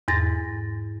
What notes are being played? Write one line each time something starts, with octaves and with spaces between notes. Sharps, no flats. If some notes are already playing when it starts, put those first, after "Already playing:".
E2 G#2 A6 A#6